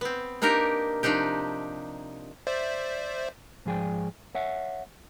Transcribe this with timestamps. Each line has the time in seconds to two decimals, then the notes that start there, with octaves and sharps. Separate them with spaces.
0.01 B3 C4
0.42 A#3 D4 D#4 G4 A#4
1.03 C3 F3 D4 D#4 G4
2.47 C5 D5 E5
3.66 G#2 F3 G#4 D5 G5
4.35 C#5 E5 F#5